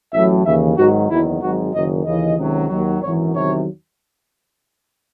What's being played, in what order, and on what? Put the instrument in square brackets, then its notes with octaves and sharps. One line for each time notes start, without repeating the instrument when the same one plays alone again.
[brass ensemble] A1 A2 F#3 E5
D#2 C#3 E3 E5
G#1 G#2 D#3 F#3 F#4
F#1 E2 D#3 F#3 E4
G#1 G#2 F#3 F#4
F#1 F#2 D#3 D#5
D#2 C#3 E3 D#5
C#2 C3 D#3 F#3
D#2 D#3 F#3
G#1 F#2 E3 C#5
E2 C3 D#3 F#3 C#5